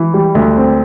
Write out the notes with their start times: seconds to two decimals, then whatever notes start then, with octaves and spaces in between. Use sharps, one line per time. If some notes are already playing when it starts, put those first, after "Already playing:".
Already playing: E3
0.14 G3
0.35 D2
0.57 C4